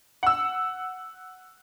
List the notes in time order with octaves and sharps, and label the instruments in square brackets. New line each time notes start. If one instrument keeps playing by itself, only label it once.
[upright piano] F#5 E6